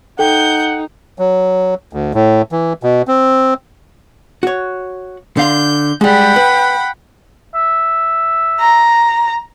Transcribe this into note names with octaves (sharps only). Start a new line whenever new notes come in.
D#4 A4 F#5 G5 G6
F#3
D2
A2
E3
B2
C4
F#4 C#5
D3 F5 C6 G6
G3 G#3 F#5 G5 B5
B4
E5
A#5